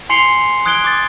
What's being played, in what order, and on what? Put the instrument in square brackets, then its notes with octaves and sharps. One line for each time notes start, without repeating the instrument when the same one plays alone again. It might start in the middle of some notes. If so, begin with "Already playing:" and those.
[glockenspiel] G#5 C6 C7 C#7 F7 G7
D#6 F#6 G#6 D7 G7
D6 A6